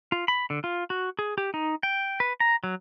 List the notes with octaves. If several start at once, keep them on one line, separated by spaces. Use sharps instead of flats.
F4
B5
D3
F4
F#4
G#4
G4
D#4
G5
B4
A#5
F#3